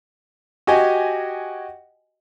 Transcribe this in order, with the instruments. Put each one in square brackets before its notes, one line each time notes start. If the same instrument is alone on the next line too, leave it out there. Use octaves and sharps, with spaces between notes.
[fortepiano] F#4 G4 D#5 G#5